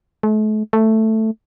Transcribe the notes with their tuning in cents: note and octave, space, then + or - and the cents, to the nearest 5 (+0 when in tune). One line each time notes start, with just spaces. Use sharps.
A3 -40
A3 +5